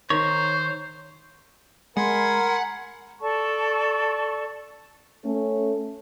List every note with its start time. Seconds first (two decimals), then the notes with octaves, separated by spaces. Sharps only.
0.10 D#3 C5 C#5
1.97 G#3 A#4 F#5 G#5 B5 C6
3.20 A4 D5 A5 C#6
5.25 A3 C#4 A4